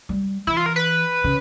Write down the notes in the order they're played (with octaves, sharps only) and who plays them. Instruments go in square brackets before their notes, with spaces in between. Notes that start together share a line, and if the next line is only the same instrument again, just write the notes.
[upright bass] G3
[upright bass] E3 [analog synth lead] E4
[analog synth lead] F4
A#4
B4
[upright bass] C#3